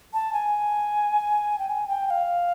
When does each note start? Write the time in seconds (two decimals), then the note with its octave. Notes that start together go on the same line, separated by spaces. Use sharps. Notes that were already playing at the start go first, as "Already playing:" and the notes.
0.13 A5
0.33 G#5
1.59 G5
1.69 G#5
1.88 G5
2.07 G5
2.10 F5